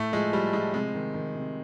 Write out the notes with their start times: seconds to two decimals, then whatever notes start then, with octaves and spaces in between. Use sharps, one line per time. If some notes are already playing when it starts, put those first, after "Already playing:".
Already playing: A2 A3
0.12 F3 G#3
0.33 F3 G3
0.53 F3 G#3
0.74 C3 G#3
0.94 D#3
1.14 D#3
1.35 C3